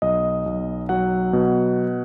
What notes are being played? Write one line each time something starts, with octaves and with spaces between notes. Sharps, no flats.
B1 D#5
B1
F#3 F#5
B2